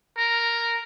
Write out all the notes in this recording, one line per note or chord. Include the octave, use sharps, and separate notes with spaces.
A#4